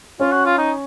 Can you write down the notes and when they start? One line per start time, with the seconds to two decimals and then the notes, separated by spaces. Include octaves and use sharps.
0.20 C#4 F4
0.32 F#4
0.45 F4
0.58 D#4